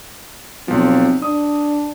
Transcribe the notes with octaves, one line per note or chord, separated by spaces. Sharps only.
B1 F3 C4
D4 D#6